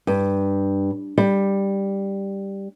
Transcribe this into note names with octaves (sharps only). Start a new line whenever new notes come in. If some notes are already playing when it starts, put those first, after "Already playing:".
G2
G3